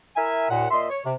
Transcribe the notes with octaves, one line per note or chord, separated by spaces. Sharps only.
E4 A#4 E5 G#5
D#2 A#2 F#5
A#2 D#5 E5 C6
C#5
C3